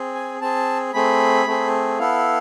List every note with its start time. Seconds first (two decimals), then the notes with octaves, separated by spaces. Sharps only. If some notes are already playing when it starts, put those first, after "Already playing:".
Already playing: C4 G#4
0.15 G#5
0.41 C4 G#4 A5
0.94 A3 C4 G#4 B5
1.46 A3 C4 G#4
1.99 B3 E4 A4 F5